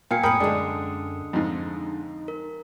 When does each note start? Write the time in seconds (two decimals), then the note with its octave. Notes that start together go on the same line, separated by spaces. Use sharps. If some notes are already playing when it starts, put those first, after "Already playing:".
0.11 A#2 F5 G5 G#5 C#7
0.23 F2 A2 A#3 A#4 G5 B5 D#6 C#7
0.40 F#2 D3 G#3 D4 G#4
1.33 F2 G#2 D#4
2.28 A#4